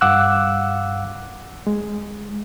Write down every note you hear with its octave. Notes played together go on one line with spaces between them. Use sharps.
G2 F5 F#5 D6 E6 F#6
G#3